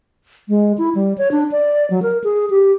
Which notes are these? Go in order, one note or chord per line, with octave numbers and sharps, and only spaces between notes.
G#3
E4
G3
C#5
D4
D5
F#3
A#4
G#4
G4